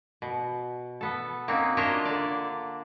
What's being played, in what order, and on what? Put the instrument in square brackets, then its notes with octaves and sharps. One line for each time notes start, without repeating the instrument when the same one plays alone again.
[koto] B2
B3 A4
A#3 C4 C#4 D#4 F#4
D4 F4 A#4 C#5 D#5 E5
D3 D5